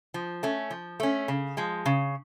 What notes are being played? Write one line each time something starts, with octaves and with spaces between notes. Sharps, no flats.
F3
A3 C#4
F3
A3 C#4
C#3
F3 G#3
C#3